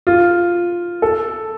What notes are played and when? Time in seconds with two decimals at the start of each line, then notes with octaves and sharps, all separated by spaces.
0.07 F4
1.02 A4